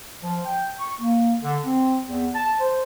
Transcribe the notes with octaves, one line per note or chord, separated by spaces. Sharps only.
F3
G5
C#6
A#3
D3
C4
E2
A5
C5